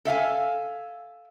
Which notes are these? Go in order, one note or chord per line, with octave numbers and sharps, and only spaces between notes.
A4 E5 F5 G#5